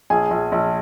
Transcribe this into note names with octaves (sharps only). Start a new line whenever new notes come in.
A#1 G#4 G#5
A#1
A#1